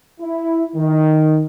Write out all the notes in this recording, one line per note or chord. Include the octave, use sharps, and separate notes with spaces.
E4
D#3